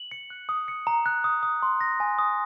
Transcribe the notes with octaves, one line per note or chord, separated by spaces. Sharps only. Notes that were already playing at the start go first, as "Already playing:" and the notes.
Already playing: F#7
C#7
F#6
D#6
C#7
A#5
F#6
D#6
D#6
C6
A#6
G#5
D#6